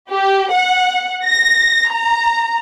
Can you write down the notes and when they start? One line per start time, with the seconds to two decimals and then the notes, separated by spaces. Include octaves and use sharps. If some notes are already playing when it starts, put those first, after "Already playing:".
0.11 G4
0.51 F#5
1.24 A#6
1.91 A#5